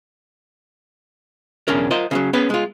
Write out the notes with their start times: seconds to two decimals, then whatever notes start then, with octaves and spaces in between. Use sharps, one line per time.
1.68 B1 E2 C#3 C#4 D4 A#4
1.91 F4 A#4 C5 D#5
2.11 C#3 E3 F#3
2.33 B3 C#4 G#4 B4
2.50 G#3 F4